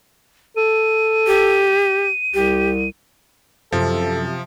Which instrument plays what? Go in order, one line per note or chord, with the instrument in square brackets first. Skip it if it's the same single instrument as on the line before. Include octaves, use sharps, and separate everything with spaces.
[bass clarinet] A4 [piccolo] D#7
[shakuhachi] G4
[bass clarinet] C2 [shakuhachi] G4
[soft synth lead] F#2 [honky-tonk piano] C3 [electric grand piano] F3 [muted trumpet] A4